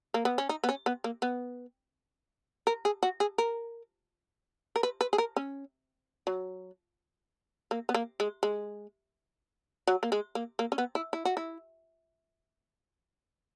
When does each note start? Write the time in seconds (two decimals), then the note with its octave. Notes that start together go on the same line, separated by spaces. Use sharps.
0.14 A#3
0.25 B3
0.38 C#4
0.49 D#4
0.64 B3
0.69 C#4
0.86 B3
1.04 A#3
1.22 B3
2.67 A#4
2.85 G#4
3.03 F#4
3.20 G#4
3.38 A#4
4.76 A#4
4.83 B4
5.01 B4
5.13 G#4
5.18 A#4
5.36 C#4
6.27 F#3
7.71 A#3
7.89 B3
7.94 A#3
8.20 G#3
8.43 G#3
9.87 F#3
10.03 A#3
10.12 G#3
10.35 A#3
10.59 A#3
10.72 C#4
10.78 B3
10.95 E4
11.13 E4
11.25 F#4
11.37 E4